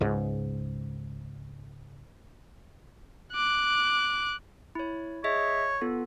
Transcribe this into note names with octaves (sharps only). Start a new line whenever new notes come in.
C#2 G#2
D6 F#6
E4 C#5
G#4 C#5 D#5 E5
B3 F4 A4